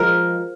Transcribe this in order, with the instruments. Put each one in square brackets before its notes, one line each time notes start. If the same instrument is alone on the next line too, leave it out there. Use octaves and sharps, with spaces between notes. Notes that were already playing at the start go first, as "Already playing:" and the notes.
Already playing: [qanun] F3 G#3 A#4